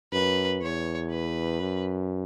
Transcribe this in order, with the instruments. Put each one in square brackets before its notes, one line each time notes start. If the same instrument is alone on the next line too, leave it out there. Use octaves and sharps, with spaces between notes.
[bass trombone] F#2 [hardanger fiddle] B4
[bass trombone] E2 [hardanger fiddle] C#5
[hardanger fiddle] B4
[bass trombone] F#2